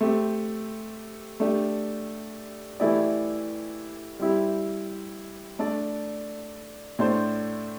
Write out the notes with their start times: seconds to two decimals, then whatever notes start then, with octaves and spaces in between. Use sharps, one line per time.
0.01 A3 C4 G4
1.40 A3 D4 G4
2.80 E3 A3 E4 G4 D5
4.19 G3 C4 E4 G4
5.59 A3 D4 A4 D5
6.99 A2 A3 D4 C5